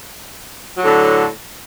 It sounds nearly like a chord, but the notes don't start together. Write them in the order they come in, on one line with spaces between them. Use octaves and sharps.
F#3 A2 D3